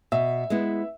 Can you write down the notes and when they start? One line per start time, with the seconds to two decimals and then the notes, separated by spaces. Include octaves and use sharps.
0.12 B2 E5
0.50 G#3 B3 E4